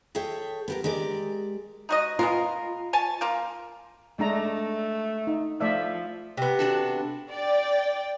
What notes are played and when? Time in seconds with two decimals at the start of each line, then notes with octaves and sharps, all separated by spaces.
0.15 G#4 A4 C#5 E5 G5
0.68 B3 G4 A#4
0.84 G#3 G4 A#4 D5
1.89 D#4 F#4 D#5
2.19 G#3 B3 F4 A#4
2.93 C#5 G#5 A5
3.21 A#3 F4
4.19 G#3 A3 D4 A#5
5.27 D#4
5.61 F3 A3 D5 E5
6.37 C3 B3
6.59 D4 F#4 A4
7.32 D5 G5